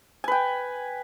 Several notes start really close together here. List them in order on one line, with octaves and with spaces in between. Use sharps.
G#5 B4 G5